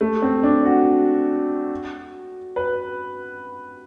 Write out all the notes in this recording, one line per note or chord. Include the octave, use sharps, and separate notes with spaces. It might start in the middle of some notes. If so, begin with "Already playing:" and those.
A3
C4
D4
F#4
B4